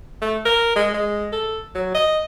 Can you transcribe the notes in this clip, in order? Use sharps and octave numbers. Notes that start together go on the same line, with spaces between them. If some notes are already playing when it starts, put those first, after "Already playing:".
A3
A#4
G#3
G#3
A4
F#3
D#5